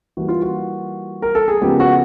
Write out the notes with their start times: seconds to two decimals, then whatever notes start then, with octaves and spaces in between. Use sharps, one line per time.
0.17 E3 G3 A#3 F#4
0.28 F4
0.42 F#4
1.22 A#4
1.35 A4
1.48 G#4
1.62 C#3 F3 G#3 B3 G4
1.80 F#4